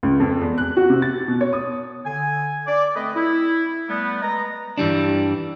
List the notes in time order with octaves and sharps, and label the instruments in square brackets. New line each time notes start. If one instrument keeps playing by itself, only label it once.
[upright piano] C#2
F2
E2
F#6
F#4
C3
A6
B2
C#5
D#6
[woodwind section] D3 G#5
D5
A3 C4 A4 B4 D#5
E4
G3 A3 B3
G#3 B4 D#5 A#5
[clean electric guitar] G2 E3 G3 D4